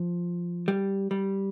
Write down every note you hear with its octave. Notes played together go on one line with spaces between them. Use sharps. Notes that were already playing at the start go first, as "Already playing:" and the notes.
Already playing: F3
G3
G3